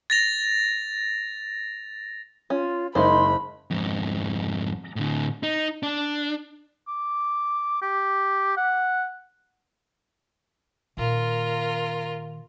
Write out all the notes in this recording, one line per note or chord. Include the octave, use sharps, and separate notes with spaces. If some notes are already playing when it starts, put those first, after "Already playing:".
A6 A#6 F7
C#4 F4
F#1 G#3 A#3 D#4 C5 B5 C6
F2 G#2
A2 D3
D#4
D4
D6
G4
F#5
A#2 D#3 F4 A#4